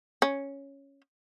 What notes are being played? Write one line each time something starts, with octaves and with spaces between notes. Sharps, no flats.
C#4